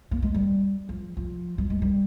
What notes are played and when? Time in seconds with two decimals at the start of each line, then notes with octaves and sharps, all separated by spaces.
0.11 A#3
0.22 G#3
0.34 G3
0.89 F3
1.17 F3
1.58 G3
1.70 G#3
1.82 G3